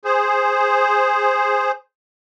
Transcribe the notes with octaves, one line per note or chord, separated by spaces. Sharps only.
G#4 C5